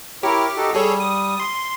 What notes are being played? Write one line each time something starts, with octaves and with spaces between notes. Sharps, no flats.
E4 G4 A#4 C#5
D#4 F#4 A4
G3 G#4 A4 C#5
D#6
C6